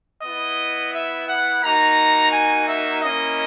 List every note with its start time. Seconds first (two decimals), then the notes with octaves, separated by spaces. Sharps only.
0.22 B3 E4 D#5
0.93 E5
1.28 F#5
1.63 A#3 D#4 F#4 A#5
2.32 G#5
2.67 E5
3.02 A#3 C#4 E4 D#5